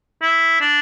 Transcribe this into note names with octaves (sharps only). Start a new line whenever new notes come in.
E4
D4